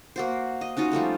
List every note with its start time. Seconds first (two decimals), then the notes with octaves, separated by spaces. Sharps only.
0.16 A#3 F#4 C5
0.61 D#5
0.77 C#4 D#4 F4 F#4
0.92 F3 G3 A3 C#4